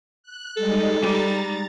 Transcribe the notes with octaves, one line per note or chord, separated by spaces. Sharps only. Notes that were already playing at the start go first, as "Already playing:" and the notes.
F#6
G3 G#3 D#4 A4
G3 A#5 A6